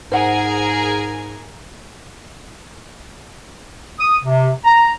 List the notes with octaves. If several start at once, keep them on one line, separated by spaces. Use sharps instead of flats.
G#2 G#4 A#4 C5 F#5 G#5
D#6
C3
A#5